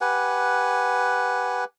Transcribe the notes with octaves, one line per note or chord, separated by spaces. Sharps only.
G4 B4 F#5 G#5